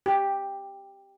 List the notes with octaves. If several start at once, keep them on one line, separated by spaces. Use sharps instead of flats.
G4